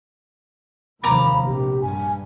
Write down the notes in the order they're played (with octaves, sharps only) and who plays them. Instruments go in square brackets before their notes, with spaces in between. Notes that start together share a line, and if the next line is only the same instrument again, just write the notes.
[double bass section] F1 D#2 F3 [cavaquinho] A#5 D6 [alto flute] B5
[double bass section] A#1 C3 [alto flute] G4
[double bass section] G2 [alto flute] G#5